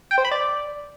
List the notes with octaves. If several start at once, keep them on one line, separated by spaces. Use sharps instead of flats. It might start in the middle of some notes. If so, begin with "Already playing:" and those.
G5
C5
B5
D5